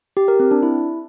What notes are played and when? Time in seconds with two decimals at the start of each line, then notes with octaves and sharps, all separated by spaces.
0.17 G4
0.28 A#4
0.40 C4
0.51 D4
0.63 E4